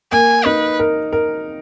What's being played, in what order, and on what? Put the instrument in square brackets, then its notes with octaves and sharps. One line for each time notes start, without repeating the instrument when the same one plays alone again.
[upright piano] A#3 [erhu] G#5
[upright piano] D#4 [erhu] B4
[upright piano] A#4
A#4